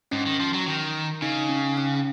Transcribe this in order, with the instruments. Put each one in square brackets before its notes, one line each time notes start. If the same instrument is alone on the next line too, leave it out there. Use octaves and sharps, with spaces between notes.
[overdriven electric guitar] G#2 [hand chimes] C#4
[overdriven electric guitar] D#3
F3
F#3
D#3
[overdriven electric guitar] C#3 [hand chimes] D#4
[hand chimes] C#4
C#4